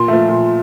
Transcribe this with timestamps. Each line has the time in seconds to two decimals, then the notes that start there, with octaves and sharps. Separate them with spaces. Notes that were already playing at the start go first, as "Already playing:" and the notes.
Already playing: A#2 C6
0.08 F3 A3
0.28 A#2